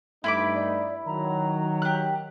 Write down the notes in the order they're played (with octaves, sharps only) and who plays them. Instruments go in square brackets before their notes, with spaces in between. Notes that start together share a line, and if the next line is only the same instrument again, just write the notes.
[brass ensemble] G2 A3 D#4 [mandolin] E4 B5 D6
[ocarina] D5
[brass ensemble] D#3 F#3 [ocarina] A#5
[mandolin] G4 F#6